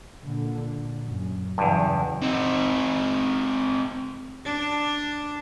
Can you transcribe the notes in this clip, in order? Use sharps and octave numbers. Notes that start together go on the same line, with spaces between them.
A#2 D3
F#2
E2 G2 C#3 E3 F#3
C4 D#4
D4